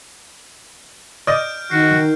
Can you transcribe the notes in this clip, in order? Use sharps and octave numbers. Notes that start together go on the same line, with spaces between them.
D5 D#5 F6 G6 D7
D#3 F#4 C7